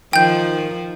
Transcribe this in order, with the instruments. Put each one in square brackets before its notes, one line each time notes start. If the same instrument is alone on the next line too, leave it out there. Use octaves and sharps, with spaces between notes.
[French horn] D#3 [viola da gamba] F3 [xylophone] G5 G6